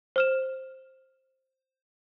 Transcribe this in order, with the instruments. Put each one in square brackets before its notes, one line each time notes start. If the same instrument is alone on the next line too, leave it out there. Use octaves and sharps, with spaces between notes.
[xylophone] C5 F6 E7